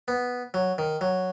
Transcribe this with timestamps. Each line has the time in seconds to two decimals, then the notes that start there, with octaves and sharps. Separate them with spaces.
0.08 B3
0.54 F#3
0.78 D#3
1.01 F#3